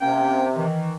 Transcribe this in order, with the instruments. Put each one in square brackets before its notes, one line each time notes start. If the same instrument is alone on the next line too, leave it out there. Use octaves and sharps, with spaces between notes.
[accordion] C3 [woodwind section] A#3 C#4 G5
[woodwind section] D#3 E3